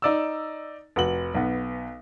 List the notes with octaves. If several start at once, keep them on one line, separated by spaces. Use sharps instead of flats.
D#4 D5 E6
F1 F#4 F#7
B1 B3